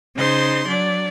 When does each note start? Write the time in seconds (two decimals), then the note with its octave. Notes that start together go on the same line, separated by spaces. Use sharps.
0.15 C#3 D#4 C5 C6 G6
0.66 F#3 D4 D5